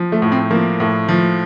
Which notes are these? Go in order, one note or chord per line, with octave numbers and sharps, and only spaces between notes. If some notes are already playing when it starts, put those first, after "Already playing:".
Already playing: F3
A3
A2
C4
F3 A#3
A2
F3